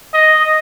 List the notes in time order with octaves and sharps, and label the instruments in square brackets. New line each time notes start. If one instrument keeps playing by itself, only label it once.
[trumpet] D#5